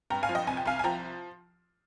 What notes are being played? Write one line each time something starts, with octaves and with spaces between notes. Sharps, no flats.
G2 G5 A#5
F5 G#5
F3
D#5 G5
C2 G#5
G5
C2 F5 G#5
G#5
F3 G5 A#5